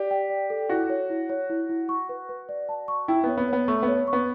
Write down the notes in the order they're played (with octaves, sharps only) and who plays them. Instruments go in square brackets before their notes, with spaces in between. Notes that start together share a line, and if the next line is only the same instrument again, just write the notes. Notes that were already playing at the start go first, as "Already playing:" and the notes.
Already playing: [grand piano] G4 [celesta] D5
[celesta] G5
D5
A4
[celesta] E4 [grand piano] F#4
[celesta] C#5
E4
C#5
E4
E4
C#6
B4
B4
D5
A5
C#6
[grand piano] E4 [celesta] G5
[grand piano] B3 [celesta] C#5
[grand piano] B3
[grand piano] B3 [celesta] C#5
[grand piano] A3 [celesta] C#6
[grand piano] B3
[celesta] C#5
C#6
[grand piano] B3